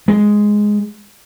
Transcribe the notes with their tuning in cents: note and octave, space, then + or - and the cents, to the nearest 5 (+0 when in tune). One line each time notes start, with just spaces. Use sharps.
G#3 +0